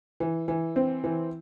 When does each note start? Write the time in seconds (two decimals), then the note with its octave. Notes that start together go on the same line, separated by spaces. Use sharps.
0.20 E3
0.48 E3
0.76 C4
1.04 E3